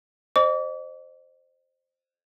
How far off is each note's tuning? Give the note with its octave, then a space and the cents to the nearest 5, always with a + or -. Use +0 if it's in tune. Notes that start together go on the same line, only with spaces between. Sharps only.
C5 +5 D#5 -35 D6 -40